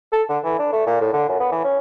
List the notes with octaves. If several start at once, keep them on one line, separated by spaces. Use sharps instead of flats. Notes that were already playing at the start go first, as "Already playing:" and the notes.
A4
D3
E3
D4
A3
A#2
A2
D3
F#2
B3
E3
C#4